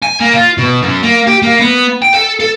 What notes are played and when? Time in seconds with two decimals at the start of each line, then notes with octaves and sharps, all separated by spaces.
0.03 G#5
0.20 A#3
0.33 F4
0.58 B2
0.82 F#2
1.03 A#3
1.27 G4
1.42 A#3
1.59 B3
2.02 G5
2.14 A4
2.40 A4